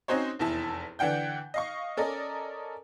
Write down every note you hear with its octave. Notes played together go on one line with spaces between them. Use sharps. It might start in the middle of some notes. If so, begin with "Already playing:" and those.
C4 C#4 D#4 F#4 C5 C#5
F1 E2 E4 A5
D3 E3 D4 F#5 G5 G6
D#5 F5 C#6
C#4 A4 A#4 D5 D#5